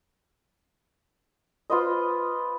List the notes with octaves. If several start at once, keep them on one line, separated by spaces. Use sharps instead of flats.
F4 B4 C5 D#5